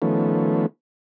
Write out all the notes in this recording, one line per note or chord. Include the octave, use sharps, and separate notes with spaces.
D#3 F3 A3 B3 C#4